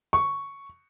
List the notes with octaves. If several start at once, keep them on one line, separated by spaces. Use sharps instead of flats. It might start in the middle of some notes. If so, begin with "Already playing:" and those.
C#6